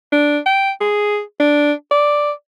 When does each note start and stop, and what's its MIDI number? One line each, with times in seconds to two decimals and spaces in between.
0.12 0.38 62
0.46 0.71 79
0.81 1.21 68
1.40 1.73 62
1.91 2.31 74